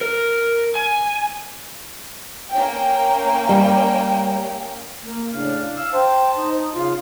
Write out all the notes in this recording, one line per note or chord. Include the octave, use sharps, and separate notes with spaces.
A#4
G#5
A#3 C#4 G5
G3
A#3
A2 C#3 D4 F5
F5 E6
C5 G5 A5
D#4
C#3 F4 F5